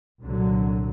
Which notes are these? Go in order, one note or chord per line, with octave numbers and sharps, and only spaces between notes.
C2 A#2 D3 F#3